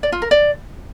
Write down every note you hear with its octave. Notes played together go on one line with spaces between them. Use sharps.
D5
F4
A#4
D5